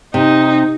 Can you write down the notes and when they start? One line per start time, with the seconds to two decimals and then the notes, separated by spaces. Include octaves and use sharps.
0.14 C3 D#4